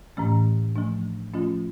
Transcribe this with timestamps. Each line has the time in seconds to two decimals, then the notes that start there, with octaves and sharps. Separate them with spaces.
0.17 A2 E3 A3 C#4
0.76 F3 A3 D4
1.34 F3 A3 C#4 F4